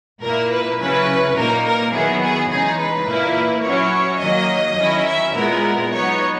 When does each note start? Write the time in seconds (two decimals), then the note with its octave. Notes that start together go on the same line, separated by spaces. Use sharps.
0.22 A#2 A#3 E4 A#4
0.51 B4
0.79 C#3 F#3 C#4 E4 B4
1.37 A#2 A#3 D#4 A#4
1.65 A#4
1.93 D#3 F#3 B3 E4 G#4
2.22 G#4
2.50 C#3 E3 G#3 D#4 G#4
2.79 B4
3.08 A#2 A#3 E4
3.64 F#3 C#4 E4 C#5
4.21 D#3 F#3 A#3 D#5
4.78 D#3 F#3 C#4 E4
5.07 E5
5.35 A#2 G#3 B3 E4 A#4
5.92 F#3 B3 D#4 C#5